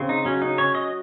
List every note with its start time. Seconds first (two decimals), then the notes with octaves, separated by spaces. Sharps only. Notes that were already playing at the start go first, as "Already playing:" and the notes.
Already playing: C#3 C4
0.09 D#4
0.25 F#3 C#4
0.42 D#4
0.58 C#4 C#5
0.75 D#5